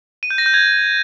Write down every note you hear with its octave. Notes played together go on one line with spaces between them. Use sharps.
D#7
G6
A#6
G6
G#6